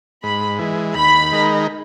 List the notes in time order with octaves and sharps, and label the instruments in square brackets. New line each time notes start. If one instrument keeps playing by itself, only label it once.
[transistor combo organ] G#2 [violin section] B5
[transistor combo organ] E3 G#3
[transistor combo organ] D#2 [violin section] B5
[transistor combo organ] D#3 G#3 D#4 A#4